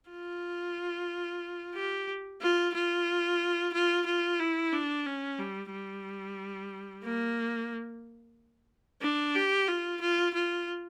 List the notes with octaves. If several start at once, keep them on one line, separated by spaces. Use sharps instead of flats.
F4
G4
F4
F4
F4
F4
E4
D4
C#4
G3
G3
A#3
D4
G4
F4
F4
F4